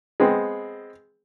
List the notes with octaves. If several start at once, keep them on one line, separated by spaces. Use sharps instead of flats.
G#3 B3 C4